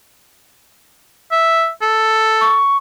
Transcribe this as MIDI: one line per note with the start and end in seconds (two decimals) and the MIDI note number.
1.32 1.69 76
1.82 2.58 69
2.41 2.77 85